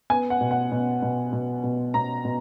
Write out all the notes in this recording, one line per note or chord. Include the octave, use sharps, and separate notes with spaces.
B3 G#5
F#5
B2
F#5
B2
B2
B2
B2
B2 A#5
B2